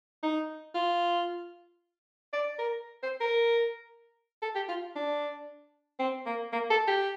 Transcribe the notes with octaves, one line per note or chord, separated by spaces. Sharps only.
D#4
F4
D5
A#4
C5
A#4
A4
G4
F4
D4
C4
A#3
A#3
A4
G4